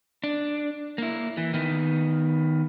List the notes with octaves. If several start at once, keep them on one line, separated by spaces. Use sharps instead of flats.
D4
A#3 E4
E3
D#3 B3